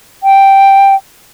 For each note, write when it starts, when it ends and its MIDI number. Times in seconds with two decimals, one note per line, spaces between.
0.23 0.95 79